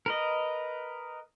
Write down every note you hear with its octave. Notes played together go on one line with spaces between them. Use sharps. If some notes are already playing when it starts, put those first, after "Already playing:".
A#4 B4 D#5